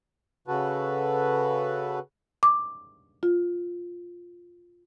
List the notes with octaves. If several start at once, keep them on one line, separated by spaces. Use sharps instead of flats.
C#3 F#4 A4 B4
D6
F4